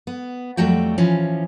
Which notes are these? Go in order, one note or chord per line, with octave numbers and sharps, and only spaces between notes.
B3
F2 F#3 G3 A3 F#4 G5
E3 F3 C#4